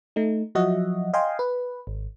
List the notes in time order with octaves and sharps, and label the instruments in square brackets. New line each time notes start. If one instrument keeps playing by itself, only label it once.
[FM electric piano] A3 D#4
F3 F#3 F#4 D#5 E5 F#5
D#5 F5 G5 G#5 C6
B4
G#1